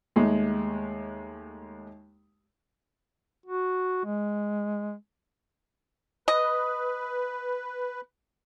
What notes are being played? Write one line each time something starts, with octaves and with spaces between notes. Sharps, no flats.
D#2 G#3 A3
F#4
G#3
B4 D#5